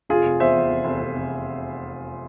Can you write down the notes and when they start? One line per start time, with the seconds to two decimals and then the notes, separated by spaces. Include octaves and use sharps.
0.09 F1 F4 G#4
0.25 F1
0.40 E2 C5 E5
0.55 E2
0.70 F1
0.85 F1
1.00 F1
1.16 F1